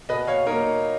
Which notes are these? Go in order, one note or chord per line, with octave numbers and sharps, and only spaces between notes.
B2 B4 D#5
C#5 F5
A#3 D#4 A#4 C#5